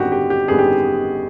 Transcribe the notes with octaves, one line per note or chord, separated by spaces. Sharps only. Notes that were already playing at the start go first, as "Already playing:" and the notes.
Already playing: G#1 F#2 D3 G3 B3 F#4 G4
G4
G4
G#1 F#2 D3 G3 B3 G#4
G4